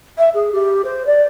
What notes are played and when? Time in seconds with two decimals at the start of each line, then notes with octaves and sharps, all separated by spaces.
0.18 E5
0.34 G#4
0.52 G4
0.84 C5
1.06 D5